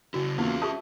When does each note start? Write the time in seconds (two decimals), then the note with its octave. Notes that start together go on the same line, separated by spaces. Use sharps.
0.14 C#3 E4 F#4
0.38 E2 C#3 A#3 C#4 F4
0.62 G4 G#4 E5 A5 D#6